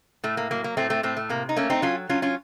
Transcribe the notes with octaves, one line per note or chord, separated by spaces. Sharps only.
A2 A3
A#3
F#3 A#3
A#3
A2 A3 C4
A3 C4
A2 A3 C4
A3
C3 A#3
D#4
A3 A#3 C#4
C4 D#4
F#3 C#4 F4
F#3 C#4 F4
C#4 F4